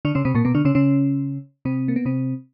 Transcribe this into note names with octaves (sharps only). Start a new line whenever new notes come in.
D3 D4
C#3 C#4
C3 C4
A#2 A#3
B2 B3
D3 D4
C#3 C#4
C#3 C#4
C3 C4
A#3
B3
C3 C4